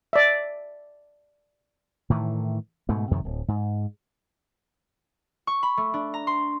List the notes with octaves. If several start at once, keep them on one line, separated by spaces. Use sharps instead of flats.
D5 E5
A2 D#3 E3
G#2 B2 A3
F2 C3 D#3
D1
G#2
C#6
B5
A3
D4
A#5
C6